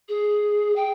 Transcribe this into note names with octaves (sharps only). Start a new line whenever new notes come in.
G#4
G5